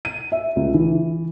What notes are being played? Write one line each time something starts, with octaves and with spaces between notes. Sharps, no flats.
D#7
E5
C#2
E3